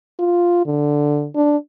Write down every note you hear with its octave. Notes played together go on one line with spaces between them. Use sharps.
F4
D3
D4